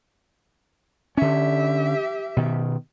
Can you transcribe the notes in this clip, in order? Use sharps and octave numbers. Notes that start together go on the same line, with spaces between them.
D3 C#4 G4 E5
B2 D#3